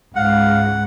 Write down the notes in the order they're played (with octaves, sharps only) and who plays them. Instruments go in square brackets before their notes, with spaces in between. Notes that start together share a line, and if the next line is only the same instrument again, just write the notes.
[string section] C#2 G#2 [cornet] F5 [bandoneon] F#5